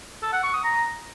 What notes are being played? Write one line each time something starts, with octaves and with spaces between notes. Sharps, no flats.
A4
F#5
C#6
D#6
A#5